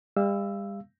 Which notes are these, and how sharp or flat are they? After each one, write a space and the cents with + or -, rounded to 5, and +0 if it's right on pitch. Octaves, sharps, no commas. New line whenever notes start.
G3 +40 F5 -25 E6 +0